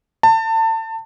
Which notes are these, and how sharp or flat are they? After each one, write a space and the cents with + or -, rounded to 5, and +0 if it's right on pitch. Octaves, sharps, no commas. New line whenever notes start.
A5 +30